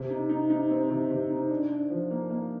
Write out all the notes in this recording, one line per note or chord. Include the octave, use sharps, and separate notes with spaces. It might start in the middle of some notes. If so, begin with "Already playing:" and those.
Already playing: C3
D#4
D#4
D#4
C4
C3
C3
D#4
D4
D4
F3
A#3
A#3